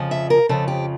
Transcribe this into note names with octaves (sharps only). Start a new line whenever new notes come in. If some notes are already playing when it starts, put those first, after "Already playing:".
Already playing: F2 C#3 F3
E5
A#4
F2 C#3 F3 A4
G4